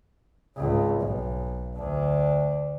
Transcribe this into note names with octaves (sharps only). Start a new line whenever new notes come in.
G#1 C#2
B1
D2 D4